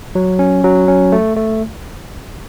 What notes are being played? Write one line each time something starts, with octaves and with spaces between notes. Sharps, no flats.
F#3
C#4
F#3
C#4
A3
A3